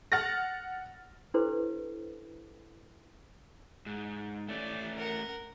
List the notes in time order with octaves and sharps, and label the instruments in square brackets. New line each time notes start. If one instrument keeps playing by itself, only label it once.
[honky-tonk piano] F#5 F6 A6 A#6
[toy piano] D4 E4 G4 A4 B4 C5
[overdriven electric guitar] G#2
[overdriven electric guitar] A3 C#4 [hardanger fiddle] D5
[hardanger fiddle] A#4 F#5